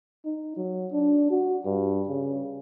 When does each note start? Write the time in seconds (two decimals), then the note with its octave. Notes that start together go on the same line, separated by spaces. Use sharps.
0.25 D#4
0.57 F#3
0.92 D4
1.31 F#4
1.65 G2
2.09 C#3